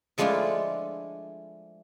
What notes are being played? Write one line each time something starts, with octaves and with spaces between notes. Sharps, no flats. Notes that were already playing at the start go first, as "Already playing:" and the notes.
F3 G#3 A3 D4 E4 F4